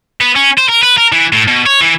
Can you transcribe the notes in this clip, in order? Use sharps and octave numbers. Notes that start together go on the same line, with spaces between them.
B3
C#4
C5
A#4
B4
A#4
E3
A2
B2
C#5
E3